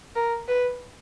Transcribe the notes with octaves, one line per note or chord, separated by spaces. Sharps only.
A#4
B4